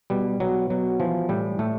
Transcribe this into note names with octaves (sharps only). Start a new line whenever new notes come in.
B2 G3
B2 F#3
B2 F#3
E3 F3
A2 G3
A2 A3